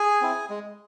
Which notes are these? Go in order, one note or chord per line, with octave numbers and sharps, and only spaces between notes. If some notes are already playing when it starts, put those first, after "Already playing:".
Already playing: G#4 G#5
C4 E4
G#3